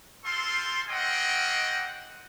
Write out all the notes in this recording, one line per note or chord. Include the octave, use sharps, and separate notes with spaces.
C4 F4 A4 C6
A#3 C4 C#4 D#5 F#5 G5